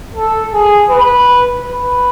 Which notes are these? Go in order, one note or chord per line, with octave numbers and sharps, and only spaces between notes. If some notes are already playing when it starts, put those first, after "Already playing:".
A4
G#4
B4
B4